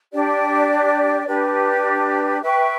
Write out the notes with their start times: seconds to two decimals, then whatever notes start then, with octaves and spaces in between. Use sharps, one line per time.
0.12 D4 G4 D5
1.26 D4 G4 B4
2.41 B4 E5 G5 C#6